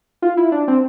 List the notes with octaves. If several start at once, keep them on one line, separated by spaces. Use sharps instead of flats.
F4
E4
D4
C4